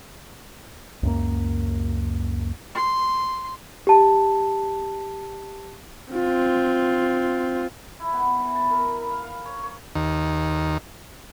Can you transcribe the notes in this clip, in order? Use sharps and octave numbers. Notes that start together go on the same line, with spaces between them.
C#2 F#2 A#3
C6
G4 A5
C4 F4
E4
B3
E3
A5
A#4
B5
F5
F5
C#5
C#5
D#2